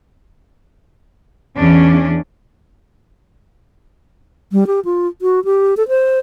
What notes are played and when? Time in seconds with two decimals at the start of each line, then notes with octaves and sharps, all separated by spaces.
1.56 E2 C#4 D4
4.52 G3
4.67 G4
4.85 F4
5.22 F#4
5.45 G4
5.77 A4
5.89 C5